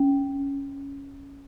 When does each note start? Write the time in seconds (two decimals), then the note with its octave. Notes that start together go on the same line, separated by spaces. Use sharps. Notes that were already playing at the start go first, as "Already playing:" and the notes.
Already playing: C#4